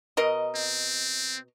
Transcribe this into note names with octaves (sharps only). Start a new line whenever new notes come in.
B2 A#4 D#5
C4